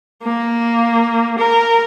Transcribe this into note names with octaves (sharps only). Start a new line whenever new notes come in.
A#3
A#4